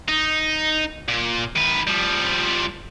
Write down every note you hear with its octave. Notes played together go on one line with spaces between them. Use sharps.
D#4
A#2
D#3 B4
F3 G3